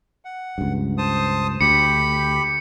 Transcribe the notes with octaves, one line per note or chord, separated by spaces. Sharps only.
F#5
C#2 G2
C5 A5 D#6
D2 G4 B5 C#7